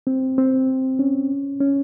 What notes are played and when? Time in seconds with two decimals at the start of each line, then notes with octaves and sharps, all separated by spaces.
0.07 C4
0.38 C4
0.99 C#4
1.60 C#4